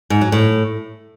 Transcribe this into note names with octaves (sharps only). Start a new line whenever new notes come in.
G#2
F#3
A2